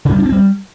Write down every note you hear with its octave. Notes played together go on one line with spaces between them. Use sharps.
C#3
G3
D4
C4
G3